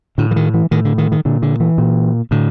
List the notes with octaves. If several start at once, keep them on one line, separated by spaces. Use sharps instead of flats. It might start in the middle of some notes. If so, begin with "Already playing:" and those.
A2 D3
E3
D#3
E3
A2 D#3
D3
D#3
D#3
A#2 D3
D3
E3
A#2
A2 D3